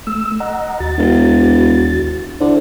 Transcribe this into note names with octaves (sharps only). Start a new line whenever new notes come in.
A3 E6
D#5 F#5 A#5
D#2 F#4 A6
E1
D3 E4 A4 C5